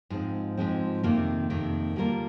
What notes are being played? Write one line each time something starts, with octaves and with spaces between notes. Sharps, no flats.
G#2 F3 G#3 C4
G#2 F3 G#3 C4
F2 C3 D#3 A#3
F2 C3 D#3 A#3
D3 G3 A#3 F4 A#4